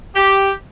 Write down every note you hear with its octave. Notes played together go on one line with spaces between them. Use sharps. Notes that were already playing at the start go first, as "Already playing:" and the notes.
G4